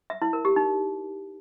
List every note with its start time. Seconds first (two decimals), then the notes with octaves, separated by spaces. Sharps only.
0.10 E5
0.22 E4
0.33 A#4
0.45 G4
0.56 D#4